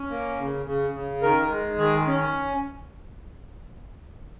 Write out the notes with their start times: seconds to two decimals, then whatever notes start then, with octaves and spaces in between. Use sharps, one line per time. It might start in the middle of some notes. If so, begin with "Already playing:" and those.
Already playing: C#4
0.10 A#3
0.38 C#3
0.65 C#3
0.94 C#3
1.22 D#3 A#4
1.50 G#3
1.78 D#3 G#4
2.07 C#4